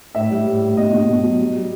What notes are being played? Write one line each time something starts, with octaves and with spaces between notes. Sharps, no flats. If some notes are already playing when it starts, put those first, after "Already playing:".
A2 E5
G3
A2
A2
B2 D#5
B2
B2
F#3
G3
G3